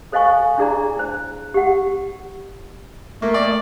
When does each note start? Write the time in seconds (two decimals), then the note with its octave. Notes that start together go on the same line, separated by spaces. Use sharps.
0.12 A4 C5 D#5 F5 G#5 C#6
0.58 D4 E4 G#4 D5 A#5
0.97 E4 C5
1.54 G4 F#5
3.22 A3 A#3
3.34 D5